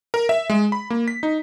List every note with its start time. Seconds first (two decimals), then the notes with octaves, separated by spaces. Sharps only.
0.14 A#4
0.29 E5
0.50 G#3
0.72 B5
0.90 A#3
1.08 B6
1.23 D#4